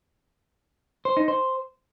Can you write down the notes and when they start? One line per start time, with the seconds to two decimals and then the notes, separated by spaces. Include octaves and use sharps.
1.05 C5
1.17 D#4
1.28 C5